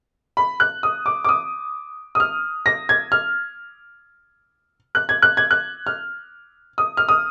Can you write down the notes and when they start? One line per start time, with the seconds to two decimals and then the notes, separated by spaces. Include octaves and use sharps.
0.37 B5
0.60 F#6
0.83 D#6
1.06 D6
1.24 D6
1.29 D#6
2.15 D#6
2.20 F6
2.66 A#6
2.89 G#6
3.12 F6
4.95 F#6
5.09 G#6
5.22 F#6
5.37 G#6
5.51 F#6
5.87 F6
6.78 D#6
6.97 F6
7.09 D#6